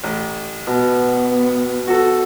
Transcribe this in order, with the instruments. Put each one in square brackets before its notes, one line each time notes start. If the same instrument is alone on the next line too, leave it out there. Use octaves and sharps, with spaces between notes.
[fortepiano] A1
[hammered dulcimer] B2 [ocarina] B3
[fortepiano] F#4 A4